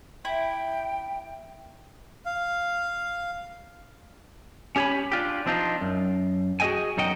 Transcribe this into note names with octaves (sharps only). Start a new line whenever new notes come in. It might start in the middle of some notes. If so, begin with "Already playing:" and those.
E4 G5
F5
C#4 G4 C#5 G#5 B5
D4 F4 G4
F3 C4 D4 D#4 F4
F#2
F#4 G#4 A#4 D#5 G5 G#5
B1 F#2 D#4 F#4 D#5 G5